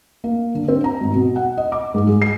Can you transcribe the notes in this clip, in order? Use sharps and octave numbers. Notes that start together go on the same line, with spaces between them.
A#3
D3
C4
A#5
G#1
B2
F#5
D#5
D6
G#2
G#3
C7